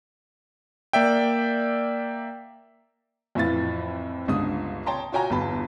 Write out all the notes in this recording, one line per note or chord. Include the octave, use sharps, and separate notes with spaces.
A#3 D5 E5 G5
F2 A2 E3 E4 F4 A6
G1 C#2 D3 D#6
C#5 G5 A5 A#5 C6
F4 F#4 C#5 G5 G#5 A#5
G1 E2 A5 B5